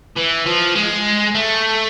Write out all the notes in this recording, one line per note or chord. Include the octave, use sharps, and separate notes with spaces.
E3
F3
G#3
A3